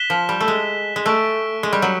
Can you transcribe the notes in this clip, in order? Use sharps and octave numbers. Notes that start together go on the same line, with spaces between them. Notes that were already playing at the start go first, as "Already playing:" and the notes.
Already playing: F#6 B6 E7 G7
F3
G3
A3
G#3
G#3
A3 C#6 F#6 B6 D7
G#3
G3
F#3